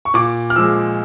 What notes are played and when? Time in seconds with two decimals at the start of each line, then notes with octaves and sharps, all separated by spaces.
0.05 C#6
0.14 A#2 D6
0.50 F6
0.56 F3 G#3 E6